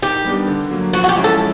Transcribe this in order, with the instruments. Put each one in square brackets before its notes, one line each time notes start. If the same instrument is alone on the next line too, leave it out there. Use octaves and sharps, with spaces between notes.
[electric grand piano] D#3 [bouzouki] G4
[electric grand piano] G3 B3 D4
D3
F#3 A#3
[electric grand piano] F3 [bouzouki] F#4
[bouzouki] F#4
G4
[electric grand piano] G#3 C#4 E4
[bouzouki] A4